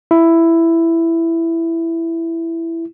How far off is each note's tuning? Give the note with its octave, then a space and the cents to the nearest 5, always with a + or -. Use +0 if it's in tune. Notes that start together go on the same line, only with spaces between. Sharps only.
E4 +10